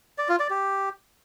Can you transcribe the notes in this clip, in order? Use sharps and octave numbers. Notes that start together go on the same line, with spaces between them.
D5
F4
D5
G4